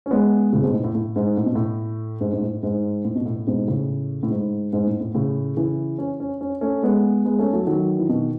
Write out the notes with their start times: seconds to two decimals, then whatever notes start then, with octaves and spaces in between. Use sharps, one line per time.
0.06 C#4
0.11 G#3 B3
0.53 A2 C#3
0.63 G#2 B2
0.74 A2
0.84 A2
0.95 A2
1.16 G#2
1.37 A2
1.46 B2
1.55 A2
2.21 G#2
2.34 G#2
2.42 A2
2.63 G#2
3.05 A2
3.15 B2
3.26 A2
3.47 G#2 B2
3.68 A2 C#3
4.23 A2
4.30 G#2
4.73 G#2
4.87 A2
5.01 A2
5.15 A2 C#3
5.57 C#3 E3
5.99 C#4
6.20 C#4
6.41 C#4
6.61 A3 C#4
6.83 G#3 B3
7.25 G#3 B3
7.39 A3 C#4
7.53 F#3 A3
7.67 D#3 F#3
7.99 E3
8.09 B2 D#3